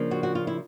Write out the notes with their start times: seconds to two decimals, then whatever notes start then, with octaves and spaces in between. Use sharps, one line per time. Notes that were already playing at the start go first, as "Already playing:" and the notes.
Already playing: C#3 F3 A#3 D4
0.11 F#4
0.23 F#4
0.35 F4
0.47 E4